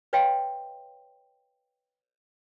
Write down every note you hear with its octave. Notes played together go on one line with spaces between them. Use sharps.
B4 C#5 D#5 F5 G5 C6